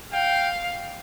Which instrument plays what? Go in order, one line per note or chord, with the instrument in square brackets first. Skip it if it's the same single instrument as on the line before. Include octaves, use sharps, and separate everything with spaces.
[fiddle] F5 [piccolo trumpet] G5